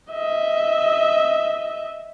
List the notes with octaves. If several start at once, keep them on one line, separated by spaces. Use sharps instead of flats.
D#5 E5